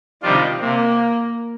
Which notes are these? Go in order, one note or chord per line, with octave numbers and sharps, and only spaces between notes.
C3 D#3 F3 G3 D4 F4
C3 A#3